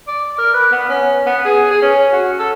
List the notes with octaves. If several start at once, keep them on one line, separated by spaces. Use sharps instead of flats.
D5
A#4
B4
B3
C#4
B3
G#4
G#4
C#4
F#4
A4